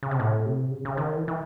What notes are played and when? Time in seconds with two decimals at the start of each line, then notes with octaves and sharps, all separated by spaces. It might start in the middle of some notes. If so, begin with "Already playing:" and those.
0.03 C#3
0.11 C3
0.19 A2
0.46 C3
0.71 C#3
0.85 C#3
0.97 D#3
1.17 E3
1.28 E3